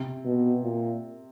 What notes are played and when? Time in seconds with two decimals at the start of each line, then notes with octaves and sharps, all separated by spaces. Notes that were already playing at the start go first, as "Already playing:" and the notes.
Already playing: C3
0.25 B2
0.64 A#2